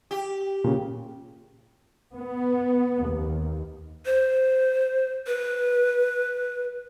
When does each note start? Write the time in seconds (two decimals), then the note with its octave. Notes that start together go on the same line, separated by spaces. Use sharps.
0.11 G4
0.64 A#2 C#3
2.16 B3
3.05 D#2
4.06 C5
5.27 B4